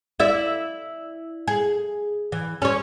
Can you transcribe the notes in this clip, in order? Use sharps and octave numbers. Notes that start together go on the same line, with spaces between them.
E4 D5 E5
G#4
E3
C#4 C#5